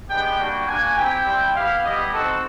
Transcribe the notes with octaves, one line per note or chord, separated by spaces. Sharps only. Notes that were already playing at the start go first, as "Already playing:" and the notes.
G#3 B3 D4 G4 G5
G3 A#3 D4 F#4 G5
A#3 D4 F#4 G#5
C4 E4 G4 G5
G3 C4 E4
B3 E4 G4 F5
G3 B3 E4 G4 D#5
C4 D#4 F#4 A4